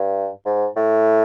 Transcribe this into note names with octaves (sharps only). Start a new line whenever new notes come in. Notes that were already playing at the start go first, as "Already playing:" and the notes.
Already playing: G2
G#2
A2